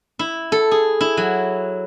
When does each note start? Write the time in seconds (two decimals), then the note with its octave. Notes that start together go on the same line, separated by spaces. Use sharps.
0.19 E4
0.52 A4
0.71 G#4
1.01 E4
1.17 F#3